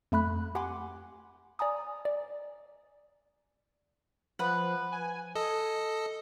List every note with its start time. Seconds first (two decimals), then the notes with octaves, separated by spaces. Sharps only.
0.12 F2 A3 B5 F#6
0.55 G4 F#5 G#5 B5 C6 D6
1.59 D5 G#5 A#5 D#6
2.05 D5
4.39 F3 B4 F#5
4.92 G#5
5.35 A4 D#5